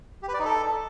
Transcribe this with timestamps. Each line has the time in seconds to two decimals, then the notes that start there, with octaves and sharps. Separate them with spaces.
0.23 G4
0.28 B4
0.34 D5
0.39 D#4
0.45 A4